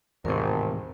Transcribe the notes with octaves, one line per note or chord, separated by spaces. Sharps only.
G#1 E2 A2 C3 A#4 C5